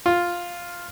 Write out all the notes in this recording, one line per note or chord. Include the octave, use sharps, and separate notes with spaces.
F4